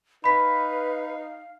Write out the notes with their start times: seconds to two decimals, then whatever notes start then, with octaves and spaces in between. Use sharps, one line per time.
0.24 D#4 B4 F5 B5 B6